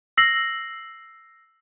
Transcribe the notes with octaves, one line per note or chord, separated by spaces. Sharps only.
E6 A#6 C7 F#7